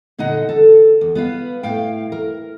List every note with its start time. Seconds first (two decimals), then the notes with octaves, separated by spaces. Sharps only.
0.18 A#2 D3 D#4 D#5 F#5
0.49 A4
1.01 E2
1.15 B3 B4 F5
1.63 A2 F5 G5
2.12 A#4